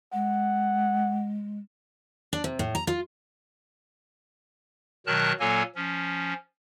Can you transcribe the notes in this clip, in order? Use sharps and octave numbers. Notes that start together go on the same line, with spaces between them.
G#3 F#5
D4
C3
A2
A#5
F4
B2 D#3 F#3 A#4 A5 F#6
A#2 F#3 A#3 A4 C#5 G#5
F3 C#4